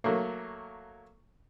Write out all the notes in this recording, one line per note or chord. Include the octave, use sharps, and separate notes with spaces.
F#3 A3 A#3